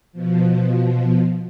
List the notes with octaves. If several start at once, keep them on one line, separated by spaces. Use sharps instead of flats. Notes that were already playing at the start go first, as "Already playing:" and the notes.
B2 F3